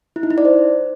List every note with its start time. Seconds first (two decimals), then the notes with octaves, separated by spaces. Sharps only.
0.16 E4
0.23 D#4
0.30 E4
0.38 D5
0.45 C5